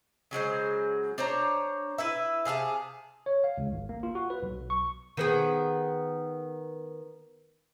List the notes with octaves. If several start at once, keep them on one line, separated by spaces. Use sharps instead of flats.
C#3 F#3 G#3 C5
D4 C5 C#5 A#5
E4 B4 E5
C3 G#4 F5 A5
C#5
F5
C#2
G#1
A#3
F4
F#4
B4
B1
C#6
D#3 B3 G#4